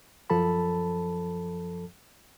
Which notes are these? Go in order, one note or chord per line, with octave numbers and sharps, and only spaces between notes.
F#2 F3 A4 A5 B5